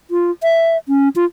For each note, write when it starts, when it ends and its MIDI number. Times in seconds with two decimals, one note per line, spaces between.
0.11 0.31 65
0.43 0.77 76
0.88 1.09 61
1.16 1.25 65